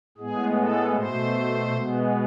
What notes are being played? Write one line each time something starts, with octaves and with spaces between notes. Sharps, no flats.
A2 G#3 B3 G#4
A4
B2 A3 C5
B2 G#3 B3